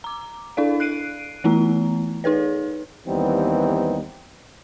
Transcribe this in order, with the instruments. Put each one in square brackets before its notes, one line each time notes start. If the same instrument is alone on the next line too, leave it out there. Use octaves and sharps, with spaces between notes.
[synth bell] A#5 D6
D4 E4 A4 D5 F5
F#6 C7 D7 D#7
E3 A3 B3 E4 A#5
D#4 G#4 B4 C#5
[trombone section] D#2 E3 G3 B3 C4 D#4